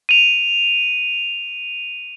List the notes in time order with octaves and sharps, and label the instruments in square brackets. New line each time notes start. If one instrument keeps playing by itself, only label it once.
[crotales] D#7 F7